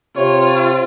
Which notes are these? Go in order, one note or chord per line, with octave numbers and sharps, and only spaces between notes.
C3 F4 C#5